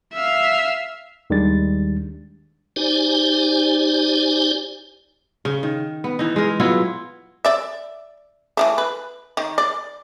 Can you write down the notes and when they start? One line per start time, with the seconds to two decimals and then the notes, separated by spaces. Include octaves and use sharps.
0.14 E5 F5
1.30 D#2 D#3 G3 G#3 D4 A6
2.76 D#4 G4 C5 D5 G#5
5.45 C#3
5.63 D#3
6.04 B3
6.19 E3 D#4
6.36 G#3 A#4
6.60 F#3 B3 E4 F4
7.45 D5 E5
8.57 E3 F#3 A3
8.78 B4
9.37 D#3
9.58 D5